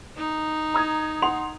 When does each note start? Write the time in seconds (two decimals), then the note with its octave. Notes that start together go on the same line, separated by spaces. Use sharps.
0.17 D#4
0.74 A#5 D#6 G#6
1.22 F#5 C6 F7